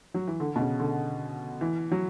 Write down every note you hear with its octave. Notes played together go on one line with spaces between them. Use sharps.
F#3
E3
D3
B2
C#3
D3
E3
F#3